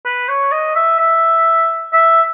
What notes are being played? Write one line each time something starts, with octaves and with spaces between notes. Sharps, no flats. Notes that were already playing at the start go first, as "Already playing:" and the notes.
B4
C#5
D#5
E5
E5
E5